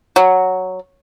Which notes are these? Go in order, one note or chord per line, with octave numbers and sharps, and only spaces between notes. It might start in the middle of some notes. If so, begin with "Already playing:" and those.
F#3